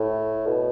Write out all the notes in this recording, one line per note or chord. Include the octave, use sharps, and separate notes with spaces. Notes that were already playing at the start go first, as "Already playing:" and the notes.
Already playing: A2
B2